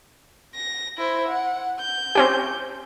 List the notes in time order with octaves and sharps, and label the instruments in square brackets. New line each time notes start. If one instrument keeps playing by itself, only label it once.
[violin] A#6
E4 C5
F#5
G6
[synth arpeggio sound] C4 C#4 G4